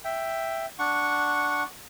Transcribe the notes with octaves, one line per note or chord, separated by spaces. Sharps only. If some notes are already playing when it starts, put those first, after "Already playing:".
E5 G5
D4 F#5 C#6